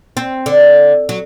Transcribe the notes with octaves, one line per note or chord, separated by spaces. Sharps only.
C4
D3
F#3